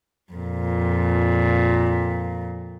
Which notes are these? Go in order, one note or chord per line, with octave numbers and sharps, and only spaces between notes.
F2 A#2